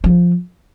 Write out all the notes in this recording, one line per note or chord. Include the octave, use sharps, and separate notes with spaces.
F3